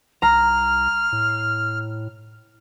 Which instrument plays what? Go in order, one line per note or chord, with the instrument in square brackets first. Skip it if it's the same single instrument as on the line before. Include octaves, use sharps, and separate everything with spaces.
[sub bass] C2 [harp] A#5 [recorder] F6
[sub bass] A2